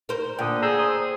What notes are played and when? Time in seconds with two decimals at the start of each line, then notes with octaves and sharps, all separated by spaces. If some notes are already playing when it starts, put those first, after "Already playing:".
0.09 A#4 C5
0.39 A#2 D3 G5 D#6
0.62 G#4 A#5 E6 G6
0.79 C5 D#6